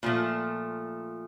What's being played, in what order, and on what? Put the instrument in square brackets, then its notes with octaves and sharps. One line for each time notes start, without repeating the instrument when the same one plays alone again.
[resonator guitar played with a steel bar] A#2 F3 A3